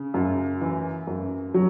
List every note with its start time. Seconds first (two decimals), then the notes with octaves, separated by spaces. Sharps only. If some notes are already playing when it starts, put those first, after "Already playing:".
Already playing: C#3
0.14 F#2
0.61 E3
1.07 F#2
1.54 F#3